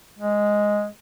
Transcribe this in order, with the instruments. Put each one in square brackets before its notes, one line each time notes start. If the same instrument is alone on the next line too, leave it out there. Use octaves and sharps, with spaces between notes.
[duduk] G#3